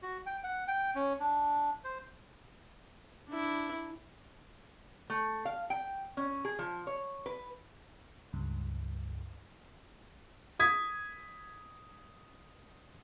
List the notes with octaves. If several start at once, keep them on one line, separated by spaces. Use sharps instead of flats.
F#4
G5
F#5
G5
C#4
D4
C5
D4 E4
A3
F5
G5
C#4
G#4
F3
C#5
B4
C#2 G2
D#6 G#6 B6